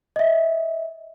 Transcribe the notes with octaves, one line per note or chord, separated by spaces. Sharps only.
D#5 E5